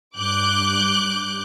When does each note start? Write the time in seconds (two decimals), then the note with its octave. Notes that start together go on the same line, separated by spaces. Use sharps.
0.17 G2 D6 F#6 G6